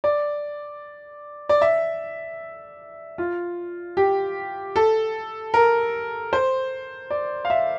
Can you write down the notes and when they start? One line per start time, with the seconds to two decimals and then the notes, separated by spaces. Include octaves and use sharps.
0.04 D5
1.49 D5
1.62 E5
3.18 F4
3.97 G4
4.76 A4
5.54 A#4
6.33 C5
7.10 D5
7.45 F5
7.50 E5